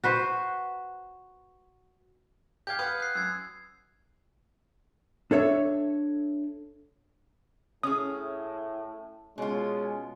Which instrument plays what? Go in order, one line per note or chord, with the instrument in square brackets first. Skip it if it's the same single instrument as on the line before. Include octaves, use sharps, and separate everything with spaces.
[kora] F#4 B4 C5
[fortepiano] G4 F5 [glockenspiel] G6 G#6
[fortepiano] B4 F5 F#5 [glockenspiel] D#6
[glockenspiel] F#6 C7
[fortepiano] F#2 [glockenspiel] E6 G#6
[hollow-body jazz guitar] D4 A4 C#5 E5
[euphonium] A2 [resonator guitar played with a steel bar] C#4 G#4 [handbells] D#6
[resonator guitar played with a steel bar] B2 F4 [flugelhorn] G#3 [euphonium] C#4